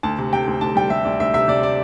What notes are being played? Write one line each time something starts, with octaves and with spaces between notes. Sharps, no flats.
D2 A5
C3
C3 G5
D2
D2 A5
G3 G5
G3 E5
D2 D5
D2 E5
C3 E5
C3 D5
D5